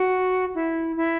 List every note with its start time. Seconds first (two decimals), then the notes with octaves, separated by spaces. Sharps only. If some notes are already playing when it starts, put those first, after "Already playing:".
Already playing: F#4
0.55 E4
0.96 E4